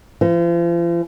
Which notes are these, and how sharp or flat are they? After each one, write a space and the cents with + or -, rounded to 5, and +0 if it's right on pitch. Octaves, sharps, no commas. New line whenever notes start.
F3 -40